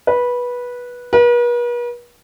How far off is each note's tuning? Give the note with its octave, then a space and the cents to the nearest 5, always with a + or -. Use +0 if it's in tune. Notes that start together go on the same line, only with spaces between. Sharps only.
B4 -15
B4 -45